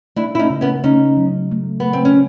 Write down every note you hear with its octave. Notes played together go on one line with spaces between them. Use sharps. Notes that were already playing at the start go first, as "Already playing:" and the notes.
A3 D4 E4
E4
C#4 D#4
C#3
B3 C#4
C#3 C#4 D#4
F#3
A3
B3
C#3
C4
C#4